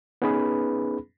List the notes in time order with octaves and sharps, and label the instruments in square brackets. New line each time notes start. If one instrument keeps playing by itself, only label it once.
[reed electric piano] B3 C#4 D#4 G#4 B4 B5